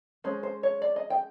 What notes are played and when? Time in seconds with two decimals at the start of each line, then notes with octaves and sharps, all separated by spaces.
0.24 G#3 C#4 C5
0.43 C5
0.63 C#5
0.82 D5
0.96 D#5
1.10 G5